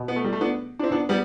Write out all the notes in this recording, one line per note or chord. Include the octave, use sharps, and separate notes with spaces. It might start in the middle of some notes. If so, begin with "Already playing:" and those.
Already playing: B2
B3
A3
G3
A3
B3 D4
D4
C4 E4
B3 D4
G3 B3